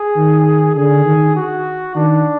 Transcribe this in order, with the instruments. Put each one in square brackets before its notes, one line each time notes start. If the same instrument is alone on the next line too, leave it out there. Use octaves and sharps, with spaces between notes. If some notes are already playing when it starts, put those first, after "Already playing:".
Already playing: [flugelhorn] G#4
[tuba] D#3
[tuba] D3 [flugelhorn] G#4
[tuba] D#3
[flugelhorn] F#4
[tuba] D#3 [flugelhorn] D4